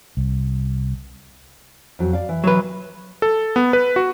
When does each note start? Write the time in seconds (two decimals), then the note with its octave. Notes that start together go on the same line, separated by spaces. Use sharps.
0.17 C2
1.99 F2 F#3
2.13 D5 F5
2.29 E3
2.44 F#3 B4
3.22 A4
3.56 B3
3.73 B4
3.96 F#4